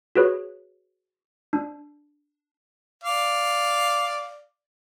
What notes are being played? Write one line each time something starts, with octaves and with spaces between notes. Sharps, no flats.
F#4 G#4 B4 C#5
D4
D5 F5